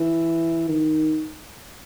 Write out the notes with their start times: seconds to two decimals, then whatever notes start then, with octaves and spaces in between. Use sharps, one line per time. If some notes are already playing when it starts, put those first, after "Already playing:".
Already playing: E3
0.68 D#3